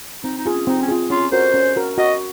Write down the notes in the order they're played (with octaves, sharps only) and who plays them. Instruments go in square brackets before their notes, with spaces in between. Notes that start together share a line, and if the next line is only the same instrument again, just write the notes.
[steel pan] C4 [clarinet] D#4
[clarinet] D#4
[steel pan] F4 G#4
[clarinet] C#4
[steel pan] C4 [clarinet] D#4
[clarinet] C#4
[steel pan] F4 G#4
[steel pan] C#4 [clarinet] F4
[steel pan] F#4 A#4 [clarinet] C5
[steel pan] C#4
F#4 A#4
[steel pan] F#4 [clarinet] D#5